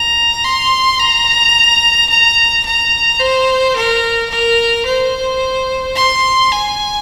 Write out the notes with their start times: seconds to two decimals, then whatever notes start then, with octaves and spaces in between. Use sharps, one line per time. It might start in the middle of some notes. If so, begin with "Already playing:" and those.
Already playing: A#5
0.44 C6
0.99 A#5
2.10 A#5
2.65 A#5
3.20 C5
3.76 A#4
4.30 A#4
4.86 C5
5.96 C6
6.52 G#5